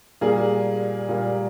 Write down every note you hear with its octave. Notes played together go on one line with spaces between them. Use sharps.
A#2 G3 A#3 G#4
A#2 G3 A#3